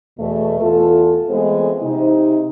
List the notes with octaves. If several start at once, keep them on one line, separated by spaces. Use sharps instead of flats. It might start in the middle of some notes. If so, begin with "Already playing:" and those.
E2 B2 A3
E2 F4 A4
E3 G#3 A3 B3 C4 G#4
C3 D#4